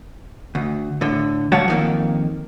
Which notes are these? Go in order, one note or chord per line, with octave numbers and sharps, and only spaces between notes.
D2
A2 D3
F#3 G3 C#5 F5 F#5 A5
F2 D#3 A#3